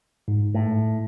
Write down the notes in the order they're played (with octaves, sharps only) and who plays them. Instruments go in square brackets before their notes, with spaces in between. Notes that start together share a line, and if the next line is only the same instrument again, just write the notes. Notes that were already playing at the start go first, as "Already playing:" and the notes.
[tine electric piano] G#2
[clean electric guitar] A2